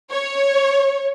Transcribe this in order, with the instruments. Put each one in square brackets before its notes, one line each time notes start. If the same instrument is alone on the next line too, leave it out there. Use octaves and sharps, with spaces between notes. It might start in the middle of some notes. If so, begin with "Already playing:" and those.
[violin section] C#5